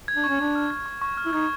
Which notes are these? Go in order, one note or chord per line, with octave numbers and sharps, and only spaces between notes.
G#6
D4
C#4 C#6
D4 C#6
F6
G#6
C#6
C#6
F6
E4
D#4 G#6